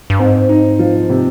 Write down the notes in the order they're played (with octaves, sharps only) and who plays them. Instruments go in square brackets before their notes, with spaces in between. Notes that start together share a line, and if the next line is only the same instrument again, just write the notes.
[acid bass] G2
[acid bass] G#2 [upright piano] C4
[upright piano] D#4
F3
C3